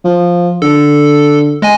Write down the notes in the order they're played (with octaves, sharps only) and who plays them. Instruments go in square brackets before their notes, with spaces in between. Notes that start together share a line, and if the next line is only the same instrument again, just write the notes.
[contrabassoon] F3
[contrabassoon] D3 [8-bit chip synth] A4
[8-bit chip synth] G#3 D#5 G#5